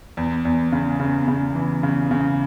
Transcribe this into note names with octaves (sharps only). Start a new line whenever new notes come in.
E2
E2
C#3
C#3
C#3
E3
C#3
C#3